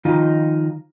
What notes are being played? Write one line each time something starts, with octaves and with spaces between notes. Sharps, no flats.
D#3 F3 D#4 F4